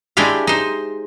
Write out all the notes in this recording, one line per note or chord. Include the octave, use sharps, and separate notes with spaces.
G#3 D4 E4 G4 F5
D#4 C5